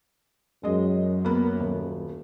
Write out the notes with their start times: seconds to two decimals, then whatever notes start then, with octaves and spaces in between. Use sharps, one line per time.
0.63 F#2 G#3 D#5
1.25 A#3 B3 A#4
1.60 D#1